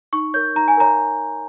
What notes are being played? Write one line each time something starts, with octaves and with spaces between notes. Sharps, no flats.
D#4 C#6
A#4 C#5 G6
D#4 A#5
G#5
A#4 C#5 A#5